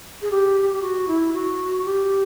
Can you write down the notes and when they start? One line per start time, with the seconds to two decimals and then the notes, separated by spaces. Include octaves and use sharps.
0.22 G#4
0.31 G4
0.73 G4
0.82 F#4
1.08 E4
1.33 F#4
1.85 G4